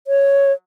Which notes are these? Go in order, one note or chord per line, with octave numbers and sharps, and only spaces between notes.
C#5